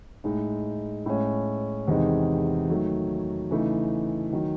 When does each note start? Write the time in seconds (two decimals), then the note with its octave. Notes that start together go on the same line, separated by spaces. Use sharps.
0.24 A2 G#3 D#4
1.06 A2 G#3 C#4
1.88 E2 C3 D#3 G#3 D#4
2.69 D#3 F#3 A3
3.51 C#3 E3 A3 D#4
4.33 D#3 F#3